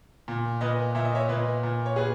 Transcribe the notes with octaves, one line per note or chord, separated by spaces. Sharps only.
A#2
A#2 B4 D#5
A#2 E5
D#5
C#5 E5
A#2 B4 D#5
A#2
C#5
A#2 G#4 B4